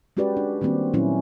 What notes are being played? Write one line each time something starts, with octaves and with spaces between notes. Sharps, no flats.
G#3 C#4 F#4 G4 B4 D5
D4
D#3 G3 A#3 C4 F#4
A#2 F#3 C#4 E4